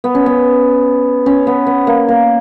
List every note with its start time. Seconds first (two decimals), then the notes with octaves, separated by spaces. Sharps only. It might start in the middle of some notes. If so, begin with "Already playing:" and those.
0.04 B3
0.15 C#4
0.26 B3
1.26 C#4
1.47 B3
1.67 B3
1.87 A#3
2.08 A#3